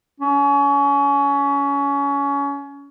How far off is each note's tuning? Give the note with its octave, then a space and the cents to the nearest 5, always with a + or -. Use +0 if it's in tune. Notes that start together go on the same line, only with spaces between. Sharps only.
C#4 +25